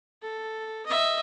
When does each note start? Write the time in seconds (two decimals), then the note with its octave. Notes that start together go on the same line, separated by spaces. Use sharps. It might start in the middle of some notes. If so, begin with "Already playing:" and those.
0.22 A4
0.86 D#5 E5